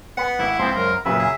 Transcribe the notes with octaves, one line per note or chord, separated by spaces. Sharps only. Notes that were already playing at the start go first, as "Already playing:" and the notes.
B3 F#5
G#1 E4
C#2 F3 C4 C5
F#2 A#4
F#2 A#2 C#3 F#3 B4 E5
G#4